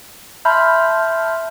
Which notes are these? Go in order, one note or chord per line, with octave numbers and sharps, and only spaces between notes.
E5 A5 B5 C6 F6 G6